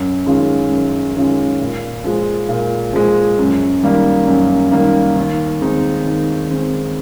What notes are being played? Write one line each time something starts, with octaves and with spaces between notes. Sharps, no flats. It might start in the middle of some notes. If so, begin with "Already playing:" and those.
Already playing: F#2
D#3 G#3 C#4 F4
F#2
D#3 G#3 C#4 F4
A#2
F3 G#3
A#2
F3 G#3
F#2
D#3 G3 A#3
F#2
D#3 G3 A#3
D#2
D#3 G#3 C4 D#4
D#2
D#3 G#3 C4 D#4